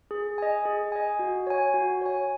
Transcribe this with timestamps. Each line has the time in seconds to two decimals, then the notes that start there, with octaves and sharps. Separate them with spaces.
0.11 G#4
0.38 D#5 G#5
0.65 G#4
0.92 D#5 G#5
1.19 F#4
1.47 C#5 G#5
1.74 F#4
2.01 C#5 G#5